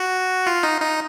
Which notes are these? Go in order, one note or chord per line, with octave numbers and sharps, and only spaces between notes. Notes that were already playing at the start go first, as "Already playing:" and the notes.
Already playing: F#4
F4
D#4
D#4